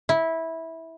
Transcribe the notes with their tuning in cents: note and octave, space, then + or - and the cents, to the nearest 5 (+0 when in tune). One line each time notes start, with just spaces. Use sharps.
E4 -15